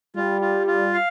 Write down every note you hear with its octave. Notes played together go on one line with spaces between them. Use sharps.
G3 F4
F4
F4
F5